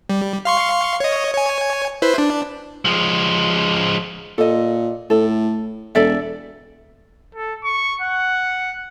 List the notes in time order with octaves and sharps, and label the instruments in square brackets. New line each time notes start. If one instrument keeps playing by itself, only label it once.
[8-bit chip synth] G3
F5 C6 C#6
C#5 D#5
C#5 G#5
E4 B4 C5
D4
[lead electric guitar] F3 G#3
[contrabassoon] A#2 [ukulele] A4 D#5
[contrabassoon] A2 [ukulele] A4
[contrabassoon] E1 [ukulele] A4 D5 E5
[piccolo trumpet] A4
C#6
F#5